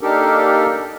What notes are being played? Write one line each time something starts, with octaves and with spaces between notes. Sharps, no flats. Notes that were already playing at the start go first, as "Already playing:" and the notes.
A#3 D4 D#4 G4 A4 A#4